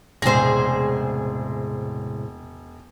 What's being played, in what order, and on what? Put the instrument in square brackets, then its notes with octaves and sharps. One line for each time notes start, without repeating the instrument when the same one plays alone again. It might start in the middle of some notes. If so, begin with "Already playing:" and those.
[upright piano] E1 A#6 [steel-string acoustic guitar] A2 C3 G#3 [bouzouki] G#4 C5